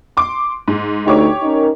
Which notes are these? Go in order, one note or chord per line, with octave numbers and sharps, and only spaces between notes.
C6 D6
G#2
D2 A3 D#4 G4 C#5 D6
C#4 D#4 A#4